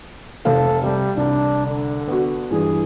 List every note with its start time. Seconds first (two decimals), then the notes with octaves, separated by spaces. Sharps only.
0.45 F1 C3 A4 F5
0.83 C3 G3
1.17 C2 D4
1.66 D3
2.08 B3 F#4
2.51 G2 E3 G#4